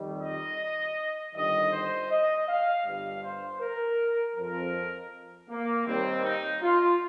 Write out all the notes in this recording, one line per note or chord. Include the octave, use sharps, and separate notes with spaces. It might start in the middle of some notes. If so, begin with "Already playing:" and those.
Already playing: F2 D#3 G3
D#5
G1 G2 D#3 G3 D#5
C5
D#5
F5
G1 G2 G3 F5
C5
A#4
F2 F3 A#4
A#3
D#2 D#3 G3 C4
D#4
F4